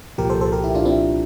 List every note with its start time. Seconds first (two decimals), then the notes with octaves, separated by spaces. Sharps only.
0.18 C2 A#2 F3 G4 A#4
0.30 A4 C5
0.41 A4 C5
0.52 G4 A#4
0.64 E4 G4
0.75 D4 F4
0.85 C4 E4